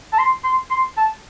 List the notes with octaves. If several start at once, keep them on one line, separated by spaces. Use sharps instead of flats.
A5
C6
C6
C6
A5